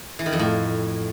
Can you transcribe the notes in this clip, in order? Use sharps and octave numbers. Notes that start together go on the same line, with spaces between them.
E3
D#3
F2
A2